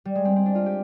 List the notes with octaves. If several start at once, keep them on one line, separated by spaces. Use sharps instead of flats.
G3
G#3
C4
C4
D4
F4
G4